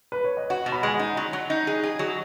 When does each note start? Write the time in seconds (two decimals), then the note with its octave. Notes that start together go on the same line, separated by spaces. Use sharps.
0.12 B4
0.24 C#5
0.37 D#5
0.50 F#4 F#5
0.66 B2
0.72 B5
0.83 G#3 G#5
0.94 F#5
0.99 D#4
1.17 F#3
1.33 F#3
1.50 D#4
1.67 G#4
1.83 G#4
1.99 F#3